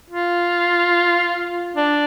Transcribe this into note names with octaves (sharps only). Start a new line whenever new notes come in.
F4
D4